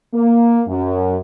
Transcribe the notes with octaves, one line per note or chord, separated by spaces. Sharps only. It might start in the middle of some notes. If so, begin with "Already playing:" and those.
A#3
F#2